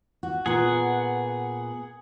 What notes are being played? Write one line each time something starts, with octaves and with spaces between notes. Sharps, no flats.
F#4
A#2 B3 G#4 F#5